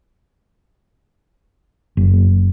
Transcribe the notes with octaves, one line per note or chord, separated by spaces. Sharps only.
F#1